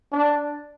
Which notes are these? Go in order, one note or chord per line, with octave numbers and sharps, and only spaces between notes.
D4